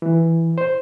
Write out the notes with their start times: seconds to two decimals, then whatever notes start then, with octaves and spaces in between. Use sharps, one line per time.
0.02 E3
0.58 C5